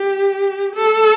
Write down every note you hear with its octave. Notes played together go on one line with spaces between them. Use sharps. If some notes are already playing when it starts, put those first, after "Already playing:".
Already playing: G4
A4